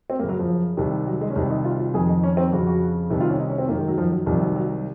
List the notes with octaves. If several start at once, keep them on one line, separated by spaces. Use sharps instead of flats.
C4
F#2 C#3 A#3
F#3
F3
C2 C3 D#3
F#3
G#3
C#4
C2 C3 D#3 D#4
D#4
F4
F4
F2 D#3 G#4
D#4
C#4
C4
F2 C#3 F#4
F#4
C2 C3 D#3
F4
C#4
D#4
C#4
C4
F#2 D#3 A#3
G#3
F#3
F3
F#3
C2 C3 D#3 F3
F#3
F#3